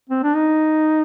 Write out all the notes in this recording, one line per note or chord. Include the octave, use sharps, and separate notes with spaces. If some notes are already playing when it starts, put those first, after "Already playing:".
C4
D4
D#4